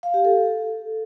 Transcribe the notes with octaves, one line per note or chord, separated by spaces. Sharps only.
F5
G4
A4